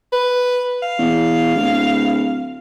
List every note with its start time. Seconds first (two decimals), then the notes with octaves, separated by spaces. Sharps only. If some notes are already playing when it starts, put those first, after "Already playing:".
0.13 B4
0.82 F5
0.99 E2
1.55 D1